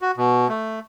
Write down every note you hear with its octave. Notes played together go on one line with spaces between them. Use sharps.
F#4
B2
A3